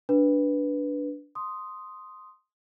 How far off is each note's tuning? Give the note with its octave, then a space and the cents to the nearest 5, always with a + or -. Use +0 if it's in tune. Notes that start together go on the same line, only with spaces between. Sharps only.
D4 -10 B4 -5
C6 +0 D#6 +0